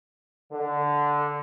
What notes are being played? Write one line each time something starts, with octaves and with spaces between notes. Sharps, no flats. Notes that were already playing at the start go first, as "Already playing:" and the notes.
D3